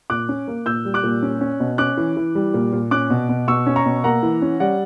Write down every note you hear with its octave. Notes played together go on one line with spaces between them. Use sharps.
A#2 D6 F#6
C#4
A#3
A#2 E6 G6
G3
D6 F#6
A#2
C#4
C#4
B2
C#4 D6 F#6
E3
E3
G3
A#2
A#2
C#4 D6 F#6
B2
B2
B2 C#6 E6
C#4
A#5 C#6
B2
A#3 F#5 A#5
E3
C#4
G3 D5 F#5